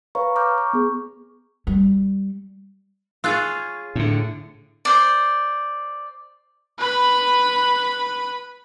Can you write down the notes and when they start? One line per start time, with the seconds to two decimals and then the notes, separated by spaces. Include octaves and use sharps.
0.15 B4 C#5 F5 A#5 C#6
0.36 A#5 D6 F6 G6
0.58 C#6
0.73 B3 G#4
1.67 G3
3.24 F4 G#4 C#5 E6 F#6 A6
3.95 A2 D3
4.85 C5 D5
6.78 B4 B5